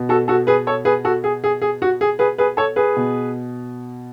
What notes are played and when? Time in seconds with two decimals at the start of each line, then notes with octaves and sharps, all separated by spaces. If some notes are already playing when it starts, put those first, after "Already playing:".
Already playing: B2
0.09 F#4 A4
0.28 F#4 A4
0.47 G#4 B4
0.67 A4 C#5
0.85 G#4 B4
1.05 F#4 A4
1.24 G#4
1.44 G#4
1.62 G#4
1.82 F#4
2.01 G#4
2.19 G#4 B4
2.38 G#4 B4
2.57 A4 C#5
2.76 G#4 B4
2.96 B2